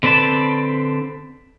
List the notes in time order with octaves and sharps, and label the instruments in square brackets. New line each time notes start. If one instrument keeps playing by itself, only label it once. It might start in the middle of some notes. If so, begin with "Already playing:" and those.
[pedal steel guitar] D3 C4 B4 D5 A5